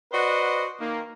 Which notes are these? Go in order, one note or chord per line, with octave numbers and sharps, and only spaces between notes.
F#4 B4 C5 D5 D#5 F#5
D#3 A#3